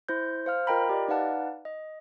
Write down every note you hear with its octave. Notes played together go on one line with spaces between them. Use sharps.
E4 C5 G6
C5 F5 F6
F4 A#4 D#5 G5 A#5 B5
G4 D5 D#5
D#4 B4 D5 F5 F#5 A5
D#5